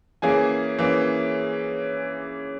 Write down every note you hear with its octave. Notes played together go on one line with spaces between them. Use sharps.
E3 A#3 C#4 G#4 G#5
E3 A#3 C#4